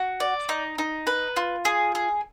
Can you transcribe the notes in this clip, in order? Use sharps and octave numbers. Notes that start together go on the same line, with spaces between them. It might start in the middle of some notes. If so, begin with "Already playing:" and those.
Already playing: F#4
D5
D#4
D#4
B4
F4
G#4
G#4